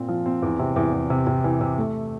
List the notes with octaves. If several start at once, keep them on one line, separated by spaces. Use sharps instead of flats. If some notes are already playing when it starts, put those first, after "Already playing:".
Already playing: A#2 C4
F3
C4
E2
C3
E2
E2
C3
C3
E3
C3
A3